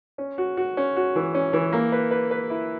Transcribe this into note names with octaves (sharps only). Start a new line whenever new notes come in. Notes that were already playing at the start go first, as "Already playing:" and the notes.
C#4
F#4
F#4
C#4
F#4
E3
C#4
E3
A#3
B4
B4
B4
E4